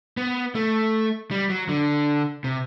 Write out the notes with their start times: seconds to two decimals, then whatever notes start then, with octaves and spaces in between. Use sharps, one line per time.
0.17 B3
0.55 A3
1.31 G3
1.50 F#3
1.69 D3
2.44 C3